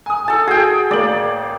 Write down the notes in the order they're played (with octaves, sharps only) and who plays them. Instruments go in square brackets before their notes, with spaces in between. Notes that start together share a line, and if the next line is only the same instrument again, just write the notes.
[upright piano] G#5 D#6
[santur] A4 A5
[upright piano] F#4 [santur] G#4 G5
[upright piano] A1 A#3 F#7 [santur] D5